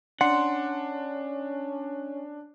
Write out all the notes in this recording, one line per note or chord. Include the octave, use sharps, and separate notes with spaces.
C#4 D4 F#5 C6